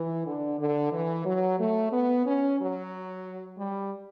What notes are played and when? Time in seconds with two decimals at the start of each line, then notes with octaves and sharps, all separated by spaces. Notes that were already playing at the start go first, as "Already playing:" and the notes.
Already playing: E3
0.26 D3
0.59 D3
0.92 E3
1.26 F#3
1.59 A3
1.92 B3
2.25 C#4
2.59 F#3
3.58 G3